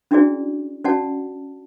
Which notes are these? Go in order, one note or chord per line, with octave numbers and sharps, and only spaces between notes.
C#4 D4 E4 F#4 G#4 D5
C#4 F#4 D5 F#5 A5